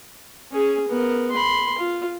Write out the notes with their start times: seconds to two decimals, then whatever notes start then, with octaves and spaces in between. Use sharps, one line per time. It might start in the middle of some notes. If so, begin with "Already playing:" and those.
0.52 C#4 G#4
0.88 B3 A#4
1.32 B5 C6
1.78 F4